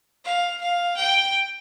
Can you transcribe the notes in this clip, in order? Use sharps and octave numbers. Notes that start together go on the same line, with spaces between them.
F5
F5
G5